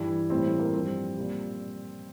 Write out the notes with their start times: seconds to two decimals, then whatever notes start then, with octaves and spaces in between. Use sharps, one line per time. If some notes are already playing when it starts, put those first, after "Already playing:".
Already playing: G2 E3 G3 E4
0.30 A2 E3 G3 C4
0.45 A3
0.59 A#3
0.73 G2 F3 C4
1.16 A#2 G3